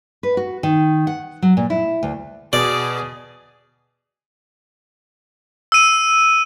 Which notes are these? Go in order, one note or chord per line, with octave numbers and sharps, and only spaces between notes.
B4
F#4
D#3
F#5
F#3
A#2
E4
D2
B2 G#4 D5
E6 D#7